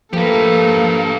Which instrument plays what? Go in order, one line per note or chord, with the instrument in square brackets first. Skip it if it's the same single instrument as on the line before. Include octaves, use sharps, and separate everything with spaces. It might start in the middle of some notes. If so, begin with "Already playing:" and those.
[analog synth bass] F3 [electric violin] A3 A4 [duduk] A#3 [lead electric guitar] G4 B4